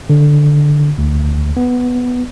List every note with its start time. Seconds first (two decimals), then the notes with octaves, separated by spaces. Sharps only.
0.10 D3
0.98 D2
1.57 B3